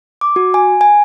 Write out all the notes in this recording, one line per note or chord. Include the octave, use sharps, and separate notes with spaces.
D6
F#4
G#5
G#5